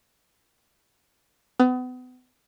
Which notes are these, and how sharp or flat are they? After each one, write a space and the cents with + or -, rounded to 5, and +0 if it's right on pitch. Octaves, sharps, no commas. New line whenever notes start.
B3 +35